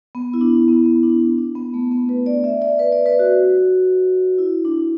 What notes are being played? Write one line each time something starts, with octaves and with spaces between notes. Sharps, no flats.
B3
E4
D4
B3
B3
D4
D4
B3
A3
B3
B4
D5
E5
D5
B4
D5
B4
F#4
E4
D4